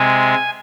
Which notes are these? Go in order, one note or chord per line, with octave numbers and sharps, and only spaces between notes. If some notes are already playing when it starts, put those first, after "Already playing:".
Already playing: C3 G#3 G#5